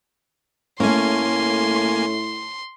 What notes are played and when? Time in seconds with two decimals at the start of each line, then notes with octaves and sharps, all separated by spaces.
0.80 A2 A3 A#3 C#4 G#5 C6